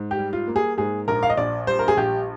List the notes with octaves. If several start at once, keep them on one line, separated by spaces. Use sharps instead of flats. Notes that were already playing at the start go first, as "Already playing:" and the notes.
Already playing: G#2
G4
G3
F4
A#3
G#4
G#2 G#4
A#1 A#4
F5
D#5
A#1 D5
G3 C5
A#4
G#4
A#1 G4